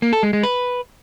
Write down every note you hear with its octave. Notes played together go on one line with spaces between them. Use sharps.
A#3
A4
G#3
G#3
B4